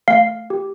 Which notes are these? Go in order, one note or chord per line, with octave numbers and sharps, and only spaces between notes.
A3 F5
G4